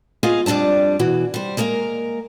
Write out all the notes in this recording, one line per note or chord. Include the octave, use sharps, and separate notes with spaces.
B3 F4 G#4 D#5 F5 G#5
F2 G3 D4 D5 A5
B2 E3 F#4
G3 C5
G#3 A#3 A#4 D#5 F5